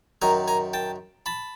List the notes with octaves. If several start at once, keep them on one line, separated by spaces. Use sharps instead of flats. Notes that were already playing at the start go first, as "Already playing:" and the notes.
F#2 D#3 G#5 A#5
G#5 A#5
G5 A5
A5 B5